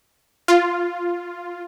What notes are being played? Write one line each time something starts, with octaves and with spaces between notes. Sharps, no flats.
F4